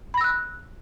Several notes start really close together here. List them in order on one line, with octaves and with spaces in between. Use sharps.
B5 A#6 E6 F#6